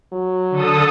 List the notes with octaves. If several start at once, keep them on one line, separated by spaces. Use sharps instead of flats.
F#3
D3 A4 D#6